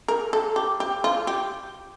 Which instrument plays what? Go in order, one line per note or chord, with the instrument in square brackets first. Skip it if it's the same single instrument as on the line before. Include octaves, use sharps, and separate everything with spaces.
[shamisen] A#4
A4
G4
G4
F4
G4